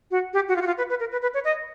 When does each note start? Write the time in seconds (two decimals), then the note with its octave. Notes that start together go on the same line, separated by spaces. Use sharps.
0.11 F#4
0.33 G4
0.48 F#4
0.56 F4
0.62 F#4
0.67 F4
0.78 B4
0.90 B4
1.00 A#4
1.12 B4
1.22 B4
1.34 C#5
1.45 D#5